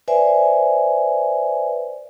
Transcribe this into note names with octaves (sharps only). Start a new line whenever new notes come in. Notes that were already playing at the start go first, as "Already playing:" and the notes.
B4 C5 D5 E5 G#5